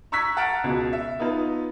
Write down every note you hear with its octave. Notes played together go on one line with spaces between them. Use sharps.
A#5 C#6 E6 F#6 G#6 B6
F#5 A5 A#5 F6 A6 D7
C#2 B2
E5
B3 D#4 F4 B4